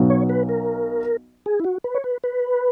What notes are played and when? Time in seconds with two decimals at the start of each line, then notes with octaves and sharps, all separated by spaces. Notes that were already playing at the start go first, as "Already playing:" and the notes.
Already playing: B1 B2 F#3
0.10 C#5
0.29 B4
0.49 A#4
1.46 G#4
1.60 E4
1.64 F#4
1.84 B4
1.94 C#5
2.04 B4
2.24 B4